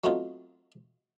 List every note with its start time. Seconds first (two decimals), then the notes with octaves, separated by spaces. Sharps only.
0.04 F#3 A3 B3 C4 D#4 F4